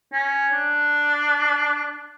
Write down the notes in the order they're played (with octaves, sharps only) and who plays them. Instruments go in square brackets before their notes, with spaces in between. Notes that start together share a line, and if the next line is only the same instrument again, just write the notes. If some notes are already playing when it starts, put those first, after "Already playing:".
[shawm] C#4
D4